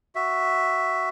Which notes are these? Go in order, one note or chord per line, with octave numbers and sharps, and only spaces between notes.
F#4 E5